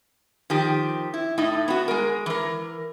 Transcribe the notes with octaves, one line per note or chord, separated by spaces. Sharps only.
D#3 F3 G4
E4
A2 D#4 E4
B3 F#4
G#3 A#4
E3 A#4